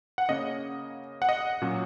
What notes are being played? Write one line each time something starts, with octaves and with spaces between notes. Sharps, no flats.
F#5
C#3 A#3 C#4 D#5
F#5
D#5
A#2 F#3 C#4